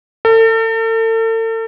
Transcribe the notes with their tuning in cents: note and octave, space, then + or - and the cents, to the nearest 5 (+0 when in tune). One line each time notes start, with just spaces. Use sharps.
A4 +40